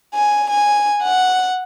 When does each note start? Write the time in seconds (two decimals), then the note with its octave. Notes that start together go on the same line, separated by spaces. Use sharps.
0.13 G#5
0.49 G#5
1.02 F#5